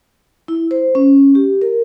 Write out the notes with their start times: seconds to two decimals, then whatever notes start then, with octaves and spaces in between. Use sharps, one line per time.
0.48 E4
0.71 C5
0.95 C#4
1.35 G4
1.61 A#4